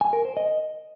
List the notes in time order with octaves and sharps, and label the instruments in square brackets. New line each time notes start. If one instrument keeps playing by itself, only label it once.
[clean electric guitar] G#5
A#4
C5
D#5